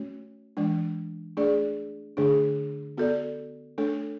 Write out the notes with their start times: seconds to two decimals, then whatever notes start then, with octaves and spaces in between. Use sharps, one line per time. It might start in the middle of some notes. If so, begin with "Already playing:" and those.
Already playing: A3 C#4 F#4 C#5
0.57 E3 G#3 D4
1.37 A3 D4 G#4 D5
2.17 D3 A3 D4 G#4
2.97 B3 F#4 A4 D5
3.78 A3 D4 A4 C#5